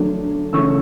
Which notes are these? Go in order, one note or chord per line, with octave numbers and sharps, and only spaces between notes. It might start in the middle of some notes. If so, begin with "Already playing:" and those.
Already playing: D3 F#3 A3 D4
C#3 E3 A3 C#4 C#6 E6